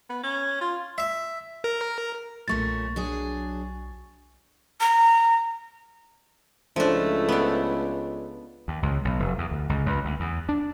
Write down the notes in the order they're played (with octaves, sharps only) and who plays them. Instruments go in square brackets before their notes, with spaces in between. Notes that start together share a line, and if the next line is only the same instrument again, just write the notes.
[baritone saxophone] B3
C#4
F4
[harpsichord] E5
[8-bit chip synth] A#4
[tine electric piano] B1 C#6 A6 [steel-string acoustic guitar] A#2 A3 C#4
[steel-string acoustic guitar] F#3 D4 G#4
[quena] A#5
[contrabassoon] C#2 [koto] F3 D4 [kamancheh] A3 E4
[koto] B3 D4
[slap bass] D#2
C#2
B1
F1
E2
D2
C#2
C#2
D2
E2
D4